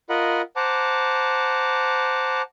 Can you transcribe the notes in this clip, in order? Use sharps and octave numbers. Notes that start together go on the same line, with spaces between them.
F4 A#4 D#5 F#5 B5
C5 F#5 A5 A#5 D6